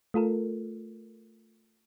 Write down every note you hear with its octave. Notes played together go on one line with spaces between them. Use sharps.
A3 F4 A4 A#4